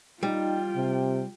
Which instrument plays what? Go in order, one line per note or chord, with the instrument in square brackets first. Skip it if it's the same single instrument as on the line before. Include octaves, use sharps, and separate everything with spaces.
[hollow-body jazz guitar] G3 [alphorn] D#4 [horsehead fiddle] F4 G5
[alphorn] C3